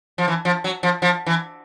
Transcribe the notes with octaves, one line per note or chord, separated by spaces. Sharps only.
F3
E3
F3
F#3
F3
F3
E3